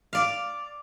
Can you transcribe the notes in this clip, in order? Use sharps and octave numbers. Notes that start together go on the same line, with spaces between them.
D5 F5